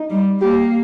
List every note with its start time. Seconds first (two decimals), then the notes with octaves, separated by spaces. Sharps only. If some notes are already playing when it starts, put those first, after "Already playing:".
Already playing: D#4
0.10 G3
0.41 A#3 G4